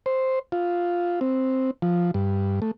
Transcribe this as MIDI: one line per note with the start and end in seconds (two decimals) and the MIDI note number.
0.06 0.39 72
0.52 1.20 65
1.21 1.71 60
1.82 2.11 53
2.14 2.60 43
2.62 2.71 57